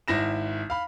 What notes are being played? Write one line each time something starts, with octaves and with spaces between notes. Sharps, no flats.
G#1 E4 A#6 E7
F5 B5